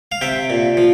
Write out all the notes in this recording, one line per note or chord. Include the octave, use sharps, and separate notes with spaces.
F5
C3 E5 G5
A#2
F3